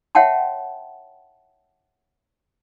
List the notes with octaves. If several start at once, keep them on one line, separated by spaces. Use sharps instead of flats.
C#5 E5 F#5 G5 A5 C6